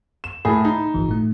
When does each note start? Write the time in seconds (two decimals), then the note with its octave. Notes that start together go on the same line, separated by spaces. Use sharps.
0.24 E7
0.45 A2 G#4 B5
0.65 D#4
0.94 G1 E3
1.09 A2 A3